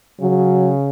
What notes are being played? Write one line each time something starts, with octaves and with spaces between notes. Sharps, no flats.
C#3 F#3